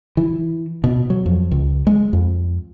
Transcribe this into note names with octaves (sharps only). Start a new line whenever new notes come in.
E3
B2
F#3
F2
C#2
G#3
F2